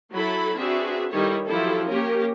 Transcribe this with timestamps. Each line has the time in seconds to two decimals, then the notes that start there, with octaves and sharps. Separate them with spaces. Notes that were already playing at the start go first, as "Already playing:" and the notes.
0.13 F#3 E4 A4 B5
0.58 C4 D4 F#4 G#4 B4 E5
1.10 D#3 G3 D#4 E4 A4 C#5
1.47 F3 F#3 E4 G4 A4
1.88 A#3 C#4 G4 A#4